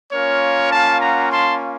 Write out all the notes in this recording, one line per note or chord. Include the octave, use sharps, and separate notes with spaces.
A#3 C#4 F4 A#4 C#5
F5 A5
F#5 A#5
A5 C6